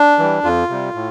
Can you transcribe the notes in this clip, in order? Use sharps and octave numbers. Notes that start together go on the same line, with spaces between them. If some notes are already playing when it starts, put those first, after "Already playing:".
Already playing: D4
E3 G3
F2 F4
C3 G3
A2